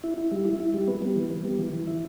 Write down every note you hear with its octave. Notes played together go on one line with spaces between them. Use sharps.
E4
E4
G3
E4
E4
G3
B3
G3
E3
B3
G3
E3
E3
E4